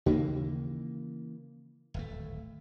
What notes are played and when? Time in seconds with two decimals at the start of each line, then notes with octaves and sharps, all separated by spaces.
0.06 D#2 C#3 E3 A#3
1.94 D1 G#1 A3